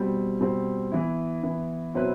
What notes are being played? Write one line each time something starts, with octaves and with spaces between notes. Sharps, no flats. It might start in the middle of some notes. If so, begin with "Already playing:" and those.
Already playing: B2 G3 C4
B2 G3 C4
E3 B3 E4
E3 B3 E4
B2 F#3 C4 E4 B4